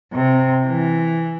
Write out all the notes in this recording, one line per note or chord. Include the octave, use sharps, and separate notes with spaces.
C3
E3